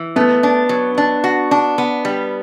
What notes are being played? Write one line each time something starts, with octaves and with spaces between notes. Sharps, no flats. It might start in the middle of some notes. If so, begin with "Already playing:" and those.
Already playing: E3
A3 B3
D4
F#3
D4
F#4
D4
B3
G3